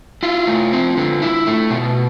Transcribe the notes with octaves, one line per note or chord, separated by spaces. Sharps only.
E4 F4
A3
C4
D3
E4
A3
B2